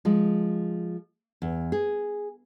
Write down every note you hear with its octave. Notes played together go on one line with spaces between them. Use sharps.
F3 G#3
E2
G#4